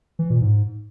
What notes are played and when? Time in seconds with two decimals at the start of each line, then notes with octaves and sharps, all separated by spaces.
0.19 E3
0.30 A#2
0.41 G#2